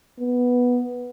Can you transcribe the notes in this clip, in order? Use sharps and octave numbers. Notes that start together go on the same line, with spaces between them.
B3